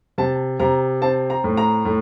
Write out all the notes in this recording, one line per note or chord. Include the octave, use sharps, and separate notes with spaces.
C3 A5
C3 A#5
C4 A5
A#5
A2
A#5
A2